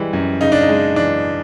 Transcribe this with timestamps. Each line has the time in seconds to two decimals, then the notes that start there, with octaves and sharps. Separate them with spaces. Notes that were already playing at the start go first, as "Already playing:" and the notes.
Already playing: E3 G3 G#3
0.13 F#2
0.41 C#3 D#4
0.52 D4
0.62 D#4
0.69 G#3
0.96 E3 D4